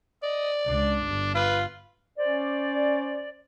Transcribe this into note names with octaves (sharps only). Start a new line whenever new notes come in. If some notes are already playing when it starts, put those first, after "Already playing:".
D5 D#5
C#2 D4
G1
F4 B4
C#4 C5 D5